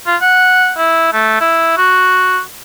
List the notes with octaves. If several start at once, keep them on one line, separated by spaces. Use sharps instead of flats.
F4
F#5
E4
A3
E4
F#4